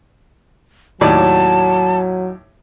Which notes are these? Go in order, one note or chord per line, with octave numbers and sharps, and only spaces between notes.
D#2 A2 F#3 D5 A5